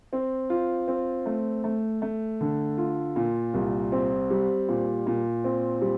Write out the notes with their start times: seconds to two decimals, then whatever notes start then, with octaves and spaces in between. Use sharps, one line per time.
0.13 C4
0.50 F4
0.88 C4
1.26 A3
1.64 A3
2.02 A3
2.41 D3
2.78 F4
3.16 A#2
3.54 C2
3.92 C4
4.30 G3
4.69 A#2
5.07 A#2
5.44 C4
5.82 G3